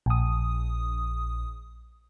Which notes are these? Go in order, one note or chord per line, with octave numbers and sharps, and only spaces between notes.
A#1 D#6